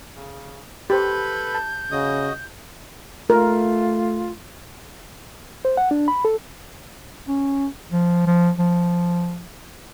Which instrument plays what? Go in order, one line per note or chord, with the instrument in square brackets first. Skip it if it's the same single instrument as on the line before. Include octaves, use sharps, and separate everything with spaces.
[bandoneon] C#3
[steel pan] G4 C5 [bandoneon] A4 B4 B5 [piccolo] G6
[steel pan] A5
[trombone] C#3 [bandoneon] F#4 D#5 D#6
[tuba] A3 [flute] F4 [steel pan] A#4
[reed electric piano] C5
F#5
D4
B5
A4
[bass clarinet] C#4
F3
F3
F3